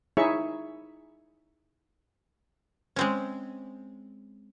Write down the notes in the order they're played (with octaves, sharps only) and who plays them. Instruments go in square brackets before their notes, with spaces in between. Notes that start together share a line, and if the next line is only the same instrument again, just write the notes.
[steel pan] D#4 E4 G#4 C#5 E5 C#6
[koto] G#3 C4 C#4